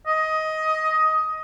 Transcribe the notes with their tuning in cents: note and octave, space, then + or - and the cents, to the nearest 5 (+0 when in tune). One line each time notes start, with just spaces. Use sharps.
D#5 +15